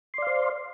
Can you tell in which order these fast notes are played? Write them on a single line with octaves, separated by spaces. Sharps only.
C6 D5 F5 C5